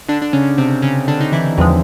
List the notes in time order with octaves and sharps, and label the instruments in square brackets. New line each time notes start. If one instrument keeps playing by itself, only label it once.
[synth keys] D3 D4
D4
C#3 C#4
C3 C4
C#3 C#4
D3 D4
D#4
E3 E4
[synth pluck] E2 C3 F3 G#3